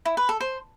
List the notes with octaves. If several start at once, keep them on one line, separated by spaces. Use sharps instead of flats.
E4
B4
A4
C5